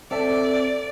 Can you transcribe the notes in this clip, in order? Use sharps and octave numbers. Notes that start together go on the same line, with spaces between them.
C4 A4 D5 E5